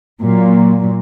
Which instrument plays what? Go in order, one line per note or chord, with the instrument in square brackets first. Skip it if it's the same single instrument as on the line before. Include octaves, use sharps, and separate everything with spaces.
[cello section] A#2 F#3